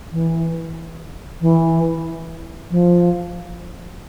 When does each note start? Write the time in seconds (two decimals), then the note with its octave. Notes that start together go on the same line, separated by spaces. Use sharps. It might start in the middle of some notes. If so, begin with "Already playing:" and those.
0.12 E3
1.41 E3
2.70 F3